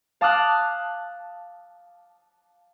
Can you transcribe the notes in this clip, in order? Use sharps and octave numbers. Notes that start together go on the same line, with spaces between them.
F5 A5 D6 D#6 F6 F#6